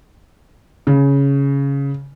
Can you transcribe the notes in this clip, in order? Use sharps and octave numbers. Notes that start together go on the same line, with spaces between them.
C#3